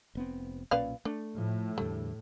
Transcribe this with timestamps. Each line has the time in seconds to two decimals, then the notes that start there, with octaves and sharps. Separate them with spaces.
0.15 F1 B3 C4
0.71 B1 A#2 C#4 B4 D5 F5
1.05 A3 D4
1.38 A2 F3
1.78 E2 D3 G3 A3